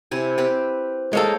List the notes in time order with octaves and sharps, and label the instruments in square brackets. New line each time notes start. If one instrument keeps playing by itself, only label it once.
[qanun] C3 E4 G#5
C4 G4 B4
[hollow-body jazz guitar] G#3 A#3 A4 [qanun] C#5 G5